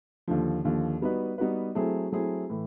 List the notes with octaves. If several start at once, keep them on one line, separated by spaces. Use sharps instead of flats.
D#2 D3 F3
D#2 D3 F3
G3 B3 D#4 F#4 B4
G3 B3 D#4 F#4 B4
F#3 A3 C4 E4 G#4
F#3 A3 C4 E4 G#4
A2 E3